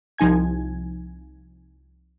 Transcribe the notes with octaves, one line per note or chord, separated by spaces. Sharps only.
C2 F3 D#4 G#5 G#6